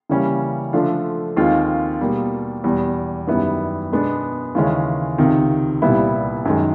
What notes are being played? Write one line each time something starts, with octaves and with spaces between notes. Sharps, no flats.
C#3 E3 G3 A#3 C#4
D3 F3 A3 D4 F4
D#2 D#3 G#3 C4 F4
B2 G3 A#3
E2 B2 G3
F#2 D#3 G3 B3 E4
B2 G#3 B3 D4
D#2 C#3 E3 G#3 C#4
C#2 C3 D#3
C2 A#2 G3 B3 E4
F#2 D#3 G#3